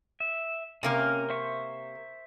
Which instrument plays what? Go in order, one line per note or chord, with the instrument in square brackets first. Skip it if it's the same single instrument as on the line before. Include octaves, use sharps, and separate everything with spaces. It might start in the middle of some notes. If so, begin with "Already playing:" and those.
[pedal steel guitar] E5
[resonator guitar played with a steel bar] C3 A#3 A#4 [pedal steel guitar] C#4
[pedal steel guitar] C5 E5 C#6